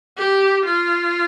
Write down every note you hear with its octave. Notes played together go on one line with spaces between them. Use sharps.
G4
F4